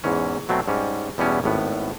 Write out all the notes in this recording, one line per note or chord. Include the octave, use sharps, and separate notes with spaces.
E2 G#2 E3 C#4
B2 F#3 A3 C4
G#2 G3 C#4
E2 B2 G3 B3 C#4 E4
G#1 A2 B3